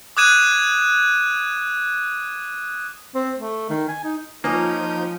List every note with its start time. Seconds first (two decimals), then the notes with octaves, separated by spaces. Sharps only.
0.17 D6 D#6 F#6 G#6 D#7 E7
3.15 C4
3.38 A3
3.70 D#3
3.89 G#5
4.04 D#4
4.44 F3 A#3 C#4 D#4 C#5 D#5 D#6 G6